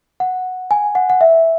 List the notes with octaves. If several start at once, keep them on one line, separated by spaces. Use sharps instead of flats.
F#5
G#5
F#5
F#5
E5